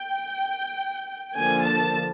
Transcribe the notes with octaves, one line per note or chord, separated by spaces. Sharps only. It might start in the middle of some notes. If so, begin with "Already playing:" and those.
Already playing: G5
D3 F3 A#3 G#5
A5